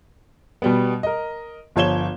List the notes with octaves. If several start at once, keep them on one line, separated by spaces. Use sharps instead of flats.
B2 G3 B3
A#4 D#5
G1 F3 C#5 G#6 E7 G7